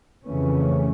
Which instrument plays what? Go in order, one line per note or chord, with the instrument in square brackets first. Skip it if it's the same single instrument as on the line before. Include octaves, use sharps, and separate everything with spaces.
[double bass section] F2 C#3 E3 A3 C#4